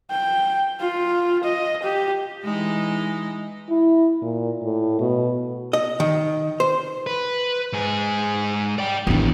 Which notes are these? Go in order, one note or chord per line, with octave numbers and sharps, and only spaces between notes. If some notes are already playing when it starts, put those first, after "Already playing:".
G5
F4
D#5
G4
E3 G#3 D#4
E4
A#2
A2
B2
D#5
D#3
C5
B4
G#2 G#4
D5 G5
A1 D#3 B3 D4